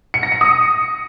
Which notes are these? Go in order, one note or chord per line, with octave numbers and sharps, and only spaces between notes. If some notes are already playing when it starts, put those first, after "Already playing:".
C#7
A#6
C#7
D#6